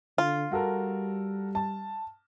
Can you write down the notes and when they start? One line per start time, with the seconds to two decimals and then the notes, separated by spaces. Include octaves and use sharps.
0.18 D3 F4
0.52 G3 F#4 A4 A#4
1.55 A5